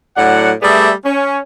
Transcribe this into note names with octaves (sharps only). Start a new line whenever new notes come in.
A2 F#3 D4 F#5
G3 A3 B3 G#4 D5 E5
C#4